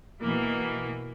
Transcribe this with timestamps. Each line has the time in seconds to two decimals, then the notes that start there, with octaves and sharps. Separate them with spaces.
0.20 B2 E3 A#3